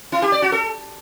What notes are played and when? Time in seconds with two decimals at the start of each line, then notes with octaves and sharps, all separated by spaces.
0.12 E4
0.22 G4
0.32 D5
0.42 F#4
0.52 A4